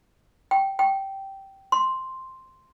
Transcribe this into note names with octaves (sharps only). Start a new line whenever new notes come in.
G5
G5
C6